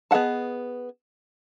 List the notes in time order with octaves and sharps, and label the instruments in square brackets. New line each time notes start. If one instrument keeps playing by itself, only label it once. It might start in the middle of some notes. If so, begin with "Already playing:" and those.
[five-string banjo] B3 G#4 D#5 F#5 A5